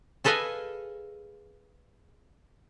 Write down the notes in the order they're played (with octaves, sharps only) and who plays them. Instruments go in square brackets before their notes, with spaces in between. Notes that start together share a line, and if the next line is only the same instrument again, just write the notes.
[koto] G#4 A4 B4 D#5 F5 G#5